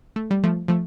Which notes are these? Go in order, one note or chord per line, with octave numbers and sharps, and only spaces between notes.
A3
G3
F3 A3
F3 A3